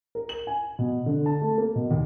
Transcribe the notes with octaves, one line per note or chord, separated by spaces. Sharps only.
A#4
F#7
G#5
B2
D3
A5
A3
A#3
B2
D#2